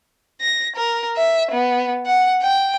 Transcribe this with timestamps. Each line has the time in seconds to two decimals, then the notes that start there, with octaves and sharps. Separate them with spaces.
0.41 A#6
0.76 A#4
1.18 E5
1.52 B3
2.06 F#5
2.42 G5